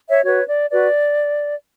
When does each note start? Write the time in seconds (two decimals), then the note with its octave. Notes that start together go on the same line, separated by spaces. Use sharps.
0.09 C#5 E5
0.23 F#4 B4 C#5
0.48 D5
0.70 F#4 B4 D5